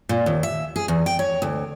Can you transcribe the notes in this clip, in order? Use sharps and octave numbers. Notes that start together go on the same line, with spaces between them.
A#2
D#2
E5
G#4
E2
G5
C#5
D2